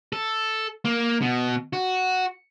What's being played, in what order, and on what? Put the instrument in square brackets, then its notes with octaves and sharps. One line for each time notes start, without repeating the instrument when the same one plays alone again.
[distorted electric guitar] A4
A#3
B2
F#4